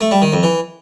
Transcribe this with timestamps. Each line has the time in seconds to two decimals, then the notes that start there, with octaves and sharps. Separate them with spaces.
0.01 A3
0.11 G3
0.22 D#3
0.33 F2
0.43 E3